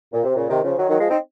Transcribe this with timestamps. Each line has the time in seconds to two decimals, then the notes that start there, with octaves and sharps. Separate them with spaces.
0.13 A#2
0.24 C3
0.36 A#2 C#3
0.49 C3 D#3
0.63 C#3 F3
0.77 D#3 F#3
0.88 D#3 F#3
0.99 F3 G#3
1.10 C4 D#4